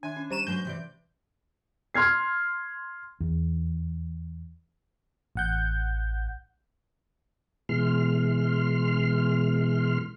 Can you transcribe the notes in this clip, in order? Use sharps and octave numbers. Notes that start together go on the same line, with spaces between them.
D#3 D4 E5 G#5 C6
C#4
G3 C5 A#5 C#6 D#7 E7
F#3 G#3 B4 G6
C3 E3 D5
C6 F6 G#6 C7
E2
A1 F#5 G6
B2 E3 G#3 C6 F6